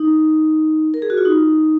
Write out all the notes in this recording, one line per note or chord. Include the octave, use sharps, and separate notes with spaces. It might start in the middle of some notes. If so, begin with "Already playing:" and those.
Already playing: D#4
A#4
G#4
F#4
F4
D#4